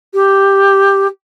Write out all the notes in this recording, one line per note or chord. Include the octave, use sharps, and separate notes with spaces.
G4